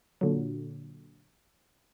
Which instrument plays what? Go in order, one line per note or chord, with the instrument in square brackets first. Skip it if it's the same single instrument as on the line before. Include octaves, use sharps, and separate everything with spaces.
[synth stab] A#2 D3 F#3